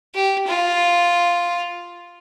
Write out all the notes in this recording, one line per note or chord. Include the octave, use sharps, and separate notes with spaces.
G4
F4